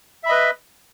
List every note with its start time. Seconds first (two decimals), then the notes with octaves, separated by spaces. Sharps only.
0.23 E5
0.26 B5
0.29 D#5
0.31 B4